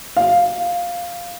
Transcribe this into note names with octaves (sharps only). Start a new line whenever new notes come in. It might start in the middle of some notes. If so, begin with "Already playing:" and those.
F5